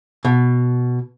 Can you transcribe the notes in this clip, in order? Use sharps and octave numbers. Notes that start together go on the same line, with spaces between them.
B2